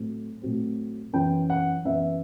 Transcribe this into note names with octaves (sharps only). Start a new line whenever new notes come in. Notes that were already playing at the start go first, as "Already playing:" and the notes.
Already playing: A2 F#3 C4
A2 F#3 C4
F#2 E3 B3 G5
F#5
F#2 E3 B3 E5